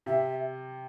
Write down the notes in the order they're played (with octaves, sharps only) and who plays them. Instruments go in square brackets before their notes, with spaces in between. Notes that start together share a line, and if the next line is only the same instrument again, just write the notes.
[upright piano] C3 [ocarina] E5